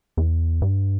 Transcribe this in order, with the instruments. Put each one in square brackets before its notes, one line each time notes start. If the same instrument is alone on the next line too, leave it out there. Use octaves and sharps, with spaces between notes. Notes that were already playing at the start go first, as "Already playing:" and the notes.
[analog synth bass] E2
G2